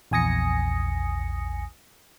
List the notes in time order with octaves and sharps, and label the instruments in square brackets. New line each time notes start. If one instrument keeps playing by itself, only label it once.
[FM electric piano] A#1 E2 G#5 D#6 A#6 C#7